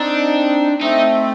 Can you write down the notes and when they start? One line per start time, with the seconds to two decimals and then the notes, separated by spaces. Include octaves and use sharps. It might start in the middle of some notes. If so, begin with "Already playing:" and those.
Already playing: C4 D4 D#4
0.81 A3 C4 D#4